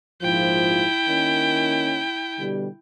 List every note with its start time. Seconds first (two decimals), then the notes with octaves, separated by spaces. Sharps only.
0.22 A#1 G#2 F3 E4 G5
1.09 D#3 A#3 C#4
2.38 B2 D3 G3